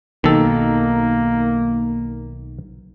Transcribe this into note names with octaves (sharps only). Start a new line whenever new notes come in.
B1 D#3 A#3 A4